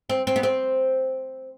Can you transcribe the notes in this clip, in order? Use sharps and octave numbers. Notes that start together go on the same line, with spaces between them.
C4
C4
B3
C4